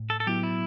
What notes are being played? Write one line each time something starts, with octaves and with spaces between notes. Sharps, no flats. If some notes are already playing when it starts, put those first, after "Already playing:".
Already playing: A2
A4
A4
F#3 B3 E4 G4
E4